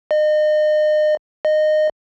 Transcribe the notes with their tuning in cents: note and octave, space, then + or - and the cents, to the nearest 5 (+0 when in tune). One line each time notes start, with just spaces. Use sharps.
D#5 -35
D#5 -20